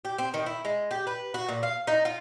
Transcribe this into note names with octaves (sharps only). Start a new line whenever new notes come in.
G4
C4
D#3
E4
G#3
G4
B4
F#4
A#2
F5
D#4
F4